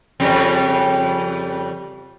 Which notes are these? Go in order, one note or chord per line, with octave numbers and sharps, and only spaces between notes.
F2 C#3 G3